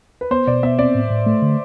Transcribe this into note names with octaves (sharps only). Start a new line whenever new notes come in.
B4
B3 C5
B2 D5
B3 E5
C4 D5
A2
A2
A3
D3